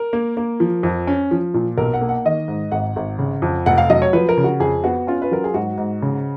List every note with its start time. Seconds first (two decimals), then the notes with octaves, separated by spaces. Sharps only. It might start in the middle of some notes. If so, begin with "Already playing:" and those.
Already playing: A#4
0.13 A#3
0.37 A#3
0.60 F3
0.83 F2
1.07 C#4
1.31 F3
1.54 A#2
1.78 B1 A#4
1.93 F#5
2.01 A#3
2.09 F#5
2.25 D#3 D#5
2.48 G#2
2.72 G#1 F#5
2.96 G#1
3.19 C#3
3.42 F2
3.66 F1 F#5
3.78 F5
3.90 F#3 D#5
4.02 C#5
4.13 F3 B4
4.29 A#4
4.37 C#3
4.44 F#4
4.60 F2 G#4
4.84 B3 F#4
5.07 C#4 F4
5.22 B4
5.31 F#3 A#4
5.44 G#4
5.54 G#2 F#4
5.78 G#2
6.02 C#3